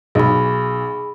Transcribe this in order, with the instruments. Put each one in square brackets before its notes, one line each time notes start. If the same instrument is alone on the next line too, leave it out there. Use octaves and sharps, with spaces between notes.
[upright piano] B1 [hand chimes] G#4 B5